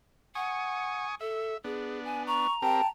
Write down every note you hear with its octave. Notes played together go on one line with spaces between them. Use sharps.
F#5 G#5 C#6 D#6
A4 E5
B3 D4 G#4
G#5
A#5 C#6
C4 G4 A#4 G5 A5